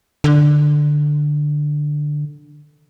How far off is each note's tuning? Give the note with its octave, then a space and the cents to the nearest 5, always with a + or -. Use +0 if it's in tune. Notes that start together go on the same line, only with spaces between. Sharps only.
D3 +10